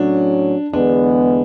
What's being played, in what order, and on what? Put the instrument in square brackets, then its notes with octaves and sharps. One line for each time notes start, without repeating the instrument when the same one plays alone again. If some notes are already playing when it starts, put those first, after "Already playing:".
Already playing: [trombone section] A2 F#3 C#4 [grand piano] D4
[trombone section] E2 D3 G#3 B3 [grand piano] D4